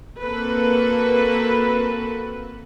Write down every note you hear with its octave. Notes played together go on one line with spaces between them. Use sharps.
A#3 C4 F#4 A4 B4